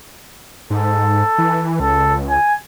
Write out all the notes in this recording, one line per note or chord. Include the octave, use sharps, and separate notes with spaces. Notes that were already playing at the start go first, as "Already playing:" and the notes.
G#2 A4
E3
C#2 A4
G#5